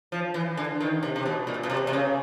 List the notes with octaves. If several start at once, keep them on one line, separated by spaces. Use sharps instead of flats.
F3
E3
D3
D#3
C3
C3
B2
A#2
B2
C3
C3
C#3